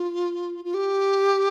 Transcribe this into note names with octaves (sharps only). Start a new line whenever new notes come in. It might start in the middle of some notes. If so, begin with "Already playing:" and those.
Already playing: F4
F4
G4